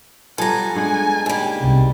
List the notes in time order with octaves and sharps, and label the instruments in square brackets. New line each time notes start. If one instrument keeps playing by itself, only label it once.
[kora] G3 B3 F4 [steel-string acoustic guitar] A4 A#5 [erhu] G#5
[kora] G2 G#3 F#5
[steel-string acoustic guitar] D#2 G3
[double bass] C2 B2